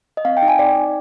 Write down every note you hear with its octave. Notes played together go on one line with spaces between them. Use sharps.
D#5
C4 F5
G5
D#4
G#5
C4 D5
D#4